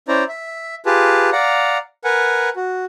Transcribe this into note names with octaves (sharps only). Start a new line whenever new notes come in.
C#4 E4 C5 D5 A#5
E5
F4 G4 G#4 B4 A5
D5 F5 F#5 A#5
A#4 B4 F#5 G#5
F#4